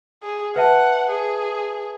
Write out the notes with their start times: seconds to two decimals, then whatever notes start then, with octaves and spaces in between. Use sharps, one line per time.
0.23 G#4
0.56 B4 E5 F#5 A5
1.11 G#4